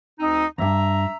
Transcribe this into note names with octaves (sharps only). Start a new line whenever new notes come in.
D2 C4 D#4
E2 G2 E5 A#5